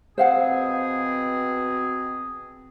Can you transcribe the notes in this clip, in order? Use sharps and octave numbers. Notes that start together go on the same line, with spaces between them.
B2 C4 G#4 C5 F5 F#5